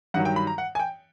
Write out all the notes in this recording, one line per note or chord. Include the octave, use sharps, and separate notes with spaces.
G2 D#3 F#3 F#5
G5
B5
A#5
F#5
G#5
G5